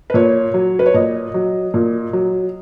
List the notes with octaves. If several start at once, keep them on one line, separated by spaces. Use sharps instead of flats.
B4
A#2 C#5
F#3
B4
C#5
A#2 D#5
F#3
A#2
F#3